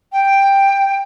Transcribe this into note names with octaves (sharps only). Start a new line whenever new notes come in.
G5